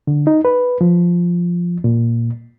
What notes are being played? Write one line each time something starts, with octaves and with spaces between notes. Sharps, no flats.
D3
D#4
B4
F3
A#2